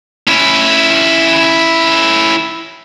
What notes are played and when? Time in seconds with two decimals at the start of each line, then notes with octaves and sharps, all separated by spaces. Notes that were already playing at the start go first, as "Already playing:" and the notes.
0.27 C#4 E4